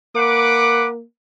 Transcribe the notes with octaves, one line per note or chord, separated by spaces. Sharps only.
A#3 B4 F#5 D6